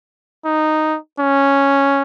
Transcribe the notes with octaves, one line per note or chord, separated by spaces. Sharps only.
D#4
C#4